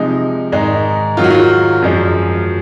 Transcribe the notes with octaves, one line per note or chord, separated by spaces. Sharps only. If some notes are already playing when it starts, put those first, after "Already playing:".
Already playing: C3 F3 G#3 D#4
G#2 D#3 G#3 D#4
G#2 D#3 F#3 F4
F#4
F4
F#2 F3 G#3